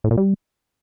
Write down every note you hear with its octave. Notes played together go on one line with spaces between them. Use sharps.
A2
A#2
G3